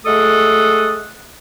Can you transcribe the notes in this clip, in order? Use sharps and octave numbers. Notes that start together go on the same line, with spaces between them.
G#3 A3 A4 F#5 D#6